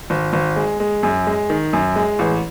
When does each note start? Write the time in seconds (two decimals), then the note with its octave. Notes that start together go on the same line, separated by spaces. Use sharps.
0.10 G#1
0.33 G#1
0.56 G#3
0.80 G#3
1.03 F#2
1.27 G#3
1.50 D#3
1.73 F#2
1.96 G#3
2.19 A1